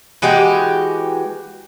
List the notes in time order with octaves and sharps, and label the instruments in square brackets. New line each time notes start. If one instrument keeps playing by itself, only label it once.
[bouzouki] E3 G#3 F#4 G4